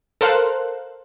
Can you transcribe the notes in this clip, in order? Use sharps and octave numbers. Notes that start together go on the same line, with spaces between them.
A4 A#4 C5 F5 F#6